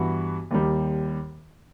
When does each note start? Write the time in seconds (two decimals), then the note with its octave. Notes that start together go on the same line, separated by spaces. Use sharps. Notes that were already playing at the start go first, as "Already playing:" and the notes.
Already playing: G2 E3 B3 F#4
0.51 D#2 D#3 G3